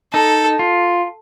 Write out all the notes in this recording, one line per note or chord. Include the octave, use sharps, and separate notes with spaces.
D#4 A4
F4